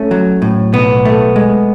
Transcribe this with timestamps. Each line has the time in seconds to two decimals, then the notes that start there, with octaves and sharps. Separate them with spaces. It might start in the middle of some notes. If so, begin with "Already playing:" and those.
Already playing: A3 C#4
0.11 F#3
0.42 A2
0.74 B1 B3
1.05 A3
1.36 G#3